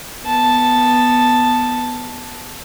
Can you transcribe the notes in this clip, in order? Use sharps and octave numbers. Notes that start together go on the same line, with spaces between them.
B3 A5